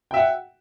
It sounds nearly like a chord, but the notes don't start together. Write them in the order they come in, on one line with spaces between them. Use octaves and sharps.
G5 E5 F#5